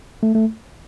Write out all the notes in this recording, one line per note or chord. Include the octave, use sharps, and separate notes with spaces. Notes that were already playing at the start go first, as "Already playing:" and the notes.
A3
A3